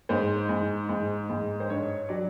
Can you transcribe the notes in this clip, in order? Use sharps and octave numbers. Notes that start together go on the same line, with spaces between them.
G#2 C5
G#2
G#2
G#2
C5
G2 C#5
F#3 D5